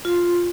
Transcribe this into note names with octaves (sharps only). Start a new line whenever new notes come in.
F4